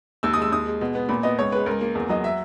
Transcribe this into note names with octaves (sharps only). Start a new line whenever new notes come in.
D#2 E6
D#6
G#3 E6
D#2 D#6
G#3
B2
B3
A#2 B5
B3 D#5
C#2 C#5
G#3 B4
C#2 A#4
A#3
E2
F#3 D#5
E5